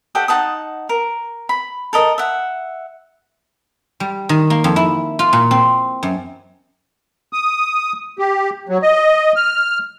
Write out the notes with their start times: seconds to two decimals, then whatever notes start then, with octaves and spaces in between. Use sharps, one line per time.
0.15 G4 A4 D#5 F#5
0.28 D#4 F#5 A5 D#6
0.89 A#4
1.49 B5
1.93 A4 A#4 D#5
2.18 E5 F#5
4.00 G3
4.29 D#3
4.50 A#3
4.64 F2
4.76 E4
5.19 F4
5.33 A#2
5.51 C4
6.03 F#2
7.33 D#6
8.19 G4
8.69 F#3
8.82 D#5
9.36 F6